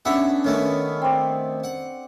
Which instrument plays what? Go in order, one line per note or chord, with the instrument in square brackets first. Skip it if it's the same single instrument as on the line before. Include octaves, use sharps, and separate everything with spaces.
[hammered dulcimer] B3 D4 A4 [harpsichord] C#4 E5 F#5
[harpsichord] D#3 A3 B3 [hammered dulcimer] C#4
[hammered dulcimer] C4 D5
[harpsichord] F#5